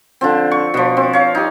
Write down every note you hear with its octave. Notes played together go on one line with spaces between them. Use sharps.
D3 F3 C4
C#6
B2 F3
C4
C#5 F5
D#4 G4